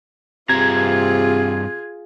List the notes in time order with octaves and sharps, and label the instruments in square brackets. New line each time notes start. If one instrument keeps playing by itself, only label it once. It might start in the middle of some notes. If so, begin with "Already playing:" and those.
[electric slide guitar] G2 C4 A#5 [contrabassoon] C3 [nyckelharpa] F4 G#4 [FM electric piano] G#6